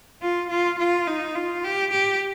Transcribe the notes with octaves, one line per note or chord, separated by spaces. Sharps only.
F4
F4
F4
D#4
F4
G4
G4